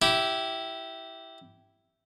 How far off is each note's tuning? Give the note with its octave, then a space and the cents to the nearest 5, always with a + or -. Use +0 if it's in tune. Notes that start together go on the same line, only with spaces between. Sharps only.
E4 +0 G4 -15